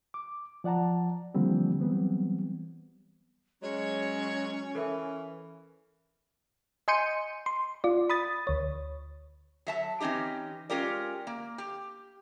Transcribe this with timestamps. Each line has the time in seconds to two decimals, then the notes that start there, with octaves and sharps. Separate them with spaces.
0.14 D6
0.64 F3 D5 F#5 A5 A#5
1.35 D3 E3 F3 G3 A#3 C4
1.80 E3 F#3 G3 B3 C4
3.62 F#3 G#3 C#4 C#5
4.75 E3 A4 A#4 E5
6.88 D#5 G#5 C6 G6 C#7 D#7
7.46 C6
7.84 F4 D5
8.10 B5 D#6 A6
8.47 D2 C#5
9.67 F#3 E5 A5
10.00 E3 C4 C#4 D#4 G4
10.70 G#3 C#4 F4 G4 A#4 D5
11.27 A#3
11.58 G4